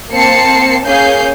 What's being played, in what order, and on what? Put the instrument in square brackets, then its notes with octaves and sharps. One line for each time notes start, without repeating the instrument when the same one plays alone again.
[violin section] A#3 C4 A5 C7 C#7
A#3 C#4 G#4 F5 G6 C7